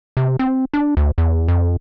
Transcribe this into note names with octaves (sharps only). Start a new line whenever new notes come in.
C3
C4
D4
D2
E2
F2